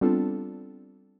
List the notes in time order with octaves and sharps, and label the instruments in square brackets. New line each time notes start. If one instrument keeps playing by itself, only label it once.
[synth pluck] G3 B3 C4 D4 F4 A4